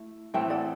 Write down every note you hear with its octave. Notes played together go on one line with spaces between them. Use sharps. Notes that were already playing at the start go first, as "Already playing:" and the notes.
Already playing: A3 E4
A2 E3 A3 C4 E5 G5
D5 F#5